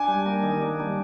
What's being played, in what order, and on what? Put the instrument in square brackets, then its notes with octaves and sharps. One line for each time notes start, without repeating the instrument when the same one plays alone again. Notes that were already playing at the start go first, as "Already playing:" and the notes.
Already playing: [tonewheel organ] D4 [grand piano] G#5
[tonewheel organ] G3
A#3
D#3
D4
G3